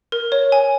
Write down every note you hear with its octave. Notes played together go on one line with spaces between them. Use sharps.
A#4
C#5
G#5